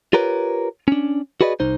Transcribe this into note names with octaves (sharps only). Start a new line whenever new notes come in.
F4 G4 A#4 B4 C#5
C#4 D4
F#4 G#4 B4 D5 D#5
C2 D#4 C5